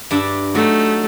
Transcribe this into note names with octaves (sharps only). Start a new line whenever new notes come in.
G2 D4 E5
F#3 A3 D#4